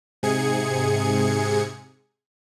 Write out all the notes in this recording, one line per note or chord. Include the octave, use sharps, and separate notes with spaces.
G#2 C3 G#4 G#6 C#7